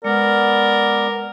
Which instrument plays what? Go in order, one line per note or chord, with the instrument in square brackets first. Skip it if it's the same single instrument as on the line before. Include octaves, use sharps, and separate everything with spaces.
[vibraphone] G#3 [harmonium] B3 D5 [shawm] A#4